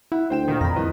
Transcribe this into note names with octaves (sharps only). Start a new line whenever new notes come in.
E4 E5 F#5
D2 C5 G5 E7
A#2 D#3
F2 B5 A#6
C2 F3 B4 D#5